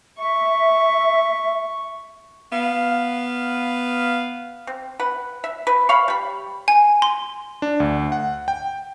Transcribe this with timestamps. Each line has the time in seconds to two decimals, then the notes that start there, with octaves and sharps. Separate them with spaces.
0.18 E5 C#6
2.51 B3 F5
4.67 C4
4.99 B4 F#5
5.44 E5
5.67 B4
5.89 C#5 F5 B5
6.08 G3 B5
6.68 G#5
7.02 C6
7.62 D4
7.80 D2
8.12 F#5
8.48 G5